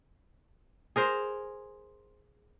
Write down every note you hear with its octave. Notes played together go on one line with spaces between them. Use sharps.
G#4 A#4 C5